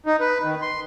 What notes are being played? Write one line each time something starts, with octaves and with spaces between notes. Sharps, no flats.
D#4
B4
D#3
C6